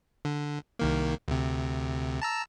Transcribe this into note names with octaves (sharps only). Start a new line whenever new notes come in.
D3
C2 D#3 A#3
D2 C3
A5 A#5 E6